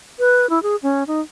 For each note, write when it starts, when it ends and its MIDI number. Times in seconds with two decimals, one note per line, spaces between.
0.19 0.49 71
0.50 0.62 64
0.63 0.76 68
0.83 1.03 61
1.07 1.21 63